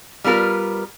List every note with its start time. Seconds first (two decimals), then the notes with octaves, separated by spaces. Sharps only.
0.24 G3 B3 F4 A#4 B4